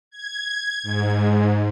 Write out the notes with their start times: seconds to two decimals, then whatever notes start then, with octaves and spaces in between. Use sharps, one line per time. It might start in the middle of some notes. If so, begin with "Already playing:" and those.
0.11 G#6
0.83 G#2